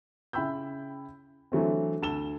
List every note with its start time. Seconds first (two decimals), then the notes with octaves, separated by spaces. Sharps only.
0.33 C#3 E4 G5 B5 E6 G6
1.52 D3 E3 F#3 A3 C4
2.02 D2 A5 E6 E7 G7